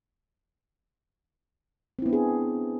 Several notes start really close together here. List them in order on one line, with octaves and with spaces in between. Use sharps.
C4 E4 B3 D4 G#4